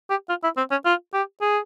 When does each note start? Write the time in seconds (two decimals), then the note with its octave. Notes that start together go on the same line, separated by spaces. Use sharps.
0.10 G4
0.29 F4
0.44 E4
0.57 C4
0.71 C#4
0.85 F4
1.14 G4
1.41 G#4